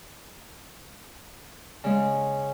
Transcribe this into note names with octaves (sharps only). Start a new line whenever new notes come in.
C#3 G#3